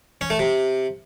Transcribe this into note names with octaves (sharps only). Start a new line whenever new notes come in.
C#4
A3
C3